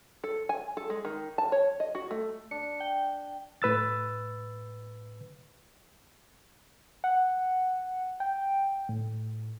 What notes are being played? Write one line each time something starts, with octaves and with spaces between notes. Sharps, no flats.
A4
G#5
A4
G#3
D#3
A5
C#5
D#5
F#4
A3
D4 C#7
G5
A2 B4 E6 A6
F#5
G5
A2